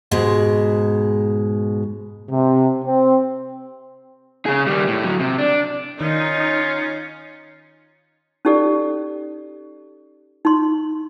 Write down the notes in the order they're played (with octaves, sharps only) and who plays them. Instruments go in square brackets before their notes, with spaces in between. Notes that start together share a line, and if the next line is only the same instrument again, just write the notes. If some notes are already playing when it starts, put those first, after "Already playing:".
[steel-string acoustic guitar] G#2 B2 G#3
[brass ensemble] C3
C4
[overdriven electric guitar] C#3 G#4
D#3 G3
A2
D2 F#3
C3
D4
[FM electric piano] D#3 [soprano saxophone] C#4 [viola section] D#4 [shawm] F4
[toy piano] C#4 D#4 G4 A4 D5
D#4 C6